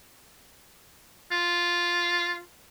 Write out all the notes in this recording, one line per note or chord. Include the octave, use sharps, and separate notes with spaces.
F4